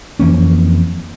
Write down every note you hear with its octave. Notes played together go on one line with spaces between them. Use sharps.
F2 E3 A#3 C#4